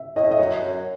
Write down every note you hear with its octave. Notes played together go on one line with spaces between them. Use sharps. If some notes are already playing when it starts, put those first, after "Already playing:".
Already playing: E5
A2 D#5
E5
D#5
F#2 C#5
F#2